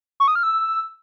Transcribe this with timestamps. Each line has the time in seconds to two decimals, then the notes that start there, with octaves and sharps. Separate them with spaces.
0.20 C#6
0.28 D#6
0.35 F6
0.43 E6